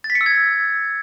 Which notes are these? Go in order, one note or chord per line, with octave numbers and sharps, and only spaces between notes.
A6
B6
C#7
E6
G#6